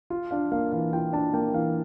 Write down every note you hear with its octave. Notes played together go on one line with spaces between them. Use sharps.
F4
D4 F5
A#3 F5
E3 F5
F4 G5
D4 A5
A#3 G5
E3 F5